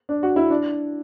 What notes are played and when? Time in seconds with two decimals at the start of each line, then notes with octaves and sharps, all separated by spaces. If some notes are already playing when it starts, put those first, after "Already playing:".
0.09 D4
0.23 F#4
0.36 E4
0.50 D4